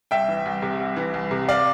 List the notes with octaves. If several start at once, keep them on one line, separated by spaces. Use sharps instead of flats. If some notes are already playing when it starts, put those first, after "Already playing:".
C2 E5 G5
E3
C2
C3
C2
E3
C2
C3
D5 F5